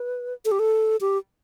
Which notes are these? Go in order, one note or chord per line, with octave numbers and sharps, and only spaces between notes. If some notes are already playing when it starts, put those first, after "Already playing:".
Already playing: B4
A4
G4
A4
G4